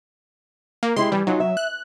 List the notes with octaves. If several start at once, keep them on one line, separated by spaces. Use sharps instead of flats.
A#3
G#3 E4 G4 C6
E3 G3
F#3 D#4 F4 G#5
E5
F#6